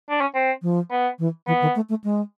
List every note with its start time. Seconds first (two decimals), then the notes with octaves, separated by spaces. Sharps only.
0.10 D4
0.21 C#4
0.35 C4
0.62 F3
0.91 B3
1.19 E3
1.47 E3 B3
1.62 D#3
1.76 A3
1.89 A3
2.04 G#3